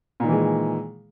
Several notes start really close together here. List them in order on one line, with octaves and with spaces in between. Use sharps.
A#2 D#3 E3 G#3